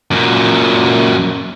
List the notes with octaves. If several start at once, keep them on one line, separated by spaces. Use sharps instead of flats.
F#2 A#2